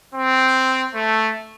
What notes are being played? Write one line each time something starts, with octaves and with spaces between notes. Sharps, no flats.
C4
A3